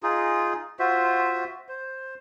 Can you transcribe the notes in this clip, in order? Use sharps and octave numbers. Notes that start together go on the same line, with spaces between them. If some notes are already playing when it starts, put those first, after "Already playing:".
D#4 F4 G#4
F4 F#4 C5 E5
C5